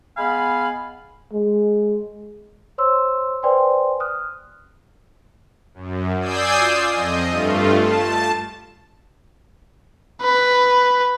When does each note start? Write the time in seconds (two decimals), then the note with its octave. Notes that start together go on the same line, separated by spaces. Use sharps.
0.17 G#3 B3 F5 G#5 B5
1.33 G#3
2.78 C5 C#5 C6 E6
3.43 B4 C5 D5 G5 G#5 C6
4.00 D#6 F6 F#6
5.74 F#2
6.19 D5 G#5 D#6 E6 G6 C7
6.58 F4
6.90 F2 D#5
7.30 G2 A3 F4
7.77 A5
10.22 B4